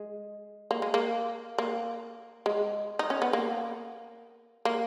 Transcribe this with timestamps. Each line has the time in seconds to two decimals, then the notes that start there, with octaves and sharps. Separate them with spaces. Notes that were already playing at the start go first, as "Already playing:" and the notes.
Already playing: G#3
0.71 A#3
0.82 G#3
0.94 A#3
1.58 A#3
2.46 G#3
2.99 D#4
3.10 C#4
3.22 B3
3.33 A#3
4.65 A#3